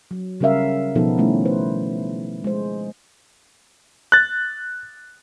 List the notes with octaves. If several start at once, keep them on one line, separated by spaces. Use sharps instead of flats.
F#3
C#3 G3 C#4 A#4 E5 F5
B2 F3 B3 D#4 A4
D#3 G3 A3 C#4 E4
B4 C5
G#3 C5
F#6 A6